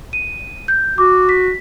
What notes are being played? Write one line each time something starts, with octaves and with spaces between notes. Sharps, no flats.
D#7
G6
F#4 D6
B6